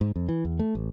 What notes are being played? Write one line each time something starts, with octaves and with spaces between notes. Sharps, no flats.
G#2
F2
E3
E2
A3
A1